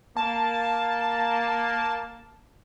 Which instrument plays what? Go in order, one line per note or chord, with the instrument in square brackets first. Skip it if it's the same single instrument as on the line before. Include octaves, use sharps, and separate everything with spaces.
[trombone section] A#3 [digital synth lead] A5